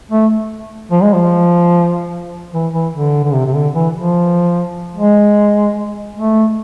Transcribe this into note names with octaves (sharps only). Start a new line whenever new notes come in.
A3
F3
G#3
F3
E3
E3
D3
D3
C3
C3
D3
E3
F3
G#3
A3